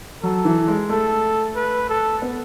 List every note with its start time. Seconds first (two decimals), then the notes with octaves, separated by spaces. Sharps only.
0.23 F#3 A4
0.45 E3
0.68 G#3
0.89 A3 A4
1.56 B4
1.89 A4
2.22 B3